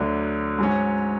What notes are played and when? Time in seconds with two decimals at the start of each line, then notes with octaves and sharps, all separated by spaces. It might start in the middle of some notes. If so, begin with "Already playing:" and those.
Already playing: D2 D3 F#3
0.58 G#2 F#3 C#4